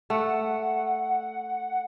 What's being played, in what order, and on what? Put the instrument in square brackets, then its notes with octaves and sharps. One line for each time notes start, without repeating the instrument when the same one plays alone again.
[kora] A3 [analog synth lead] F#5